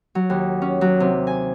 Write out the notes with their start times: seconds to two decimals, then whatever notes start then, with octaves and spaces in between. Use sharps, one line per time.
0.15 F#3
0.30 D#2
0.62 C#4
0.81 F#3
1.00 C3
1.27 G#5